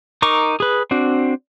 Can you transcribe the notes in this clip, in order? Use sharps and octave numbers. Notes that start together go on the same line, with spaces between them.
D#4 A#4 C#6 D6
G#4 B4
C4 D4 F#4